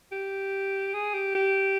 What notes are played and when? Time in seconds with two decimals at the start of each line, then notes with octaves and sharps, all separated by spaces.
0.12 G4
0.94 G#4
1.14 G4
1.35 G4